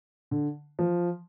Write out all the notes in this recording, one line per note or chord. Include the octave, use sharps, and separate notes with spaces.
D3
F3